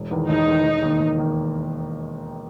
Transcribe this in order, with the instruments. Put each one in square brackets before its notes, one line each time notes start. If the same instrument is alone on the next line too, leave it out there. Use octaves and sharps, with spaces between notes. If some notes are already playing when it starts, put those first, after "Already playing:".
Already playing: [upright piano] E1
E2 D#3
[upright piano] E1 [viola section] D#4
[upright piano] E2 D#3
E1
D#2 D#3 A#3
E1
D#3 A#3